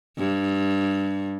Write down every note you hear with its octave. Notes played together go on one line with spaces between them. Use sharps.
G2